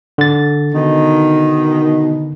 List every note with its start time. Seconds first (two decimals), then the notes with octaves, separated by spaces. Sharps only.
0.18 D3 A6
0.73 B2 D#3